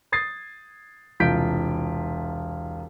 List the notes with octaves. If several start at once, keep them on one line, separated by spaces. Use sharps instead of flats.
D#6 G#6 A6 C7
E1 C2 F4 G6 B6 D7